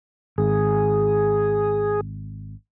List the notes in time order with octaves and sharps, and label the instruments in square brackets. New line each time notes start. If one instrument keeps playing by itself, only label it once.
[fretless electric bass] G#1 [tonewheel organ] G#4